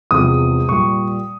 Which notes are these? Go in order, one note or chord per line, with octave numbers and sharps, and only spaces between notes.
E2 C3 F3 G#3 D#6
A#2 G3 C#6